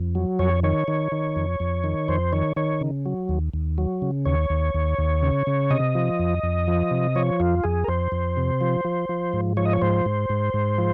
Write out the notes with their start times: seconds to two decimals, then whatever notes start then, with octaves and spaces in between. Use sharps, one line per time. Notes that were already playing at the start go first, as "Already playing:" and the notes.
Already playing: F2
0.15 F#3
0.39 F2 C#5
0.63 D#3 C#5
0.88 D#3
1.12 D#3
1.36 F2
1.60 F2
1.84 D#3
2.08 F2 C5
2.32 D#3 C#5
2.56 D#3 C#5
2.81 C#3
3.06 F#3
3.29 D#2
3.54 D#2
3.78 F#3
4.02 C#3
4.25 D#2 C#5
4.50 D#2
4.74 D#2
4.98 D#2
5.22 C#3
5.47 C#3
5.70 C3 D#5
5.95 F3
6.19 F2
6.43 F2
6.68 F3
6.91 C3
7.15 F3 C#5
7.40 F2 F4
7.64 F2 G#4
7.84 A#4
7.88 F2 C5
8.12 F2
8.37 C3
8.61 F3
8.85 F3
9.09 F3
9.33 G#2
9.57 F3 C#5
9.65 D#5
9.73 C#5
9.81 G#2 C5
10.06 G#2
10.30 G#2
10.54 G#2
10.78 F3